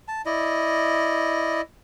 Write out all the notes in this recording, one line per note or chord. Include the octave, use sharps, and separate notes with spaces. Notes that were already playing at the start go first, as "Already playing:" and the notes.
A5
E4 D5 D#5